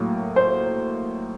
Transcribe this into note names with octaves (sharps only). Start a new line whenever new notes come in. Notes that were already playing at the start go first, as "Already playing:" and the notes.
Already playing: A2 F#3 A#3
C5